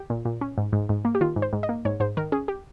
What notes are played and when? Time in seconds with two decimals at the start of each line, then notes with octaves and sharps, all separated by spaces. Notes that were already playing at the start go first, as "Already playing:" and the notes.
Already playing: G4
0.10 A#2
0.25 A#2
0.41 C#4
0.58 G#2
0.73 G#2
0.89 G#2
1.05 A#3
1.15 G4
1.21 D#3 F4
1.36 G#2
1.42 C5
1.53 G#2
1.63 D#5
1.69 A#3
1.85 G#2 C#5
2.00 G#2 C5
2.17 D#3 A#4
2.32 C#4 G#4
2.48 G4